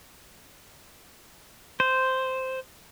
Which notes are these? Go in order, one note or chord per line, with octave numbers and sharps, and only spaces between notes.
C5